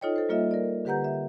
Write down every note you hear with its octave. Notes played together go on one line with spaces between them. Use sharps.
D#4 F4 A4 C#5 D#5 G5
A4 C5
G3 A#3 F4 D#5 E5
A#4 D5
D3 G4 B4 F#5 A#5 G6
E5